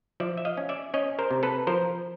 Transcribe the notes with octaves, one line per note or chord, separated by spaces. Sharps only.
F3 D5 E5
E5
D#5 F5
C#4
D5 E5
C#4 C#5 D#5
A#4 C5
C3
A4 B4
F3 A#4 C5